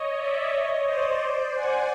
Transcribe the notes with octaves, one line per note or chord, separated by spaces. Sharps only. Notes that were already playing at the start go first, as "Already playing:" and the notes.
Already playing: C#5 D#5
D5 E5
C#5 D#5
C5 D5
C5 D5
F#5 G#5